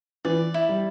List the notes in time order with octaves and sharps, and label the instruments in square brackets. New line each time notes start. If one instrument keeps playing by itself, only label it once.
[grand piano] E3 [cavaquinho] D5
[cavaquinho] E4
[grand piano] G3